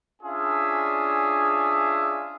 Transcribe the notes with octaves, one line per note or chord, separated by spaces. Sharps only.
C#4 D4 F4 G#4 E5 G#5